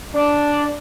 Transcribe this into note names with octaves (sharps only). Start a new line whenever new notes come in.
D4